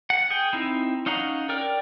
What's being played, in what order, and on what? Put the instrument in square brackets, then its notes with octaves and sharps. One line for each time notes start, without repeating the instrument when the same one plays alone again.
[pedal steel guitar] F#5
G#4 G5
C4 D#4 E4
C#4 D#4 F5 F#5 A#5
A#4 D5 G5 F6